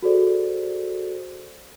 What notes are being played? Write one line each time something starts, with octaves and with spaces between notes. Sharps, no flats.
F#4 G#4 A4 C5 D5